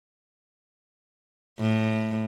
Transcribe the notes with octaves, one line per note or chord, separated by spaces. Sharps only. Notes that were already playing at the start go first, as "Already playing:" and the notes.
A2